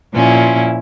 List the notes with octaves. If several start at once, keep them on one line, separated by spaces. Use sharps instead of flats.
A#2 F3 C#4 E4